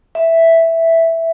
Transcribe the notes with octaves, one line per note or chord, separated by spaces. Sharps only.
E5